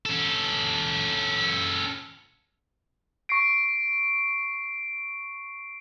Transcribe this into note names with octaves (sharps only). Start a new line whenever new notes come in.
C#4 A4
C#6 A#6 C7 D7